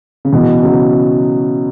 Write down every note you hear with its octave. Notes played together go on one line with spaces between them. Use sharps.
C#3
B2 E3
C#3 F#3